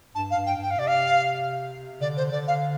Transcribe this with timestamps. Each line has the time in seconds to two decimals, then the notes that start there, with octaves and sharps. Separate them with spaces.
0.15 G2 A5
0.30 F5
0.36 G2
0.46 G5
0.56 G2
0.62 G5
0.70 F5
0.77 C3 D5
0.87 F5
2.01 D3 D5
2.17 C5
2.32 D3 D5
2.47 F5